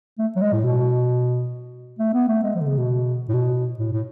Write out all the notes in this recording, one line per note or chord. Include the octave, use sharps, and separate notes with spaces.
A3
F#3
G#3
A2
B2
A3
B3
A3
G#3
F3
D3
C#3
B2
A2
B2
A2
A2